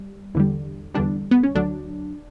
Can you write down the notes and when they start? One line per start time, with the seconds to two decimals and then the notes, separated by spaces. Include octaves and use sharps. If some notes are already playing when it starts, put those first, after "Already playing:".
Already playing: G3
0.35 E2 D3 G3
0.94 E2 D3 G3 D4
1.31 B3
1.43 C#4
1.55 D2 D3 F#3 D4